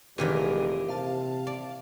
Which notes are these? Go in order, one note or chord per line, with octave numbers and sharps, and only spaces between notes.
F1 A#2 D#3 E3 G4 G#4 A#4 D#7
C3 F5 A5
D5